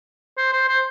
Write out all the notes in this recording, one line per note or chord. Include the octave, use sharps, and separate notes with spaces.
C5
C5
C5